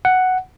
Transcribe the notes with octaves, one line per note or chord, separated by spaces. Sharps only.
F#5